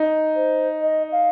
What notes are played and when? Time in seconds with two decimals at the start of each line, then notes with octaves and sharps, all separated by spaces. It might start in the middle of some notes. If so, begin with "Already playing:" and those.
Already playing: D#4
0.35 C5
0.81 D#5
1.12 F5